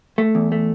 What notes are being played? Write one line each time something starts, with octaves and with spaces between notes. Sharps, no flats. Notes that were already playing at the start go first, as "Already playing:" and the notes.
A3
E2
A3